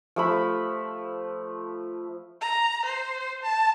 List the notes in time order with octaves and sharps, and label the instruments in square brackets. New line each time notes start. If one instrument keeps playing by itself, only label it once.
[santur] F3 A3 B5
[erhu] A#5
C5
A5